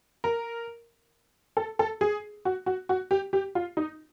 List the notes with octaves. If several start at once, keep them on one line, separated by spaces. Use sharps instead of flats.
A#4
A4
A4
G#4
F#4
F#4
F#4
G4
G4
F4
D#4